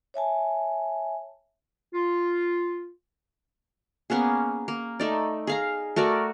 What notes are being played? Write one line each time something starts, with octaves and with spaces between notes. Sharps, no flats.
C#5 E5 G#5 A5
F4
A#3 B3 C#4 G#4
A#3
A3 D#4 D5
G#4 F5 A#5
A3 F#4 A#4 D5